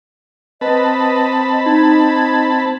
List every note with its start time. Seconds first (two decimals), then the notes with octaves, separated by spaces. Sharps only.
0.61 C4 B4 D#5 A5 B5
1.66 D#4 G#6